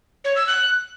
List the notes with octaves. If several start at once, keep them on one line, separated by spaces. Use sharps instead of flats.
C#5
E6
F#6